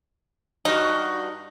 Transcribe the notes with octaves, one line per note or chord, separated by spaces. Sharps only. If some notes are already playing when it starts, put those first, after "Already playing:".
G2 D#4 F#4